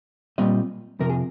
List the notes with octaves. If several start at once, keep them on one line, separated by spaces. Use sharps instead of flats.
A#2 G3 C4 D#5
F2 C3 F3 A#4
G#4